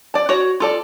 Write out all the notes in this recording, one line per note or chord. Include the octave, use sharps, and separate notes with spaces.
D5 A5
F#4 C#5
F4 A4 D5